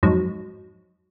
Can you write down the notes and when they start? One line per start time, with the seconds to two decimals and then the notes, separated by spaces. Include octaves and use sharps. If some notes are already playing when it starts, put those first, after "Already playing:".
0.03 F2 G#2 F#3